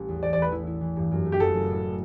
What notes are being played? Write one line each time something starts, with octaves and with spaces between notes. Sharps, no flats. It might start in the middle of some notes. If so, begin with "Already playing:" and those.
Already playing: A1 G3
E2
A3 D5
D5
E2 B4
E4
E4
E3
G2
F#2
A3
G4
F#1 A4
F#1
A2